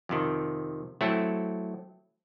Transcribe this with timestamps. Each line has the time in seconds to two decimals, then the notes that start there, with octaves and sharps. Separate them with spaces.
0.09 F2 C3 D#3
1.01 F#3 A3 C4 E4 A4